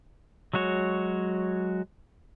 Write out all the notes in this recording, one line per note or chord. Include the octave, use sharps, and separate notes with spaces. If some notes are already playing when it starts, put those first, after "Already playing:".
F#3 G#3 F#4 C#5